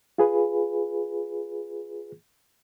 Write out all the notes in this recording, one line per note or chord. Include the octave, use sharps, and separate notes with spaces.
F4 G#4 B4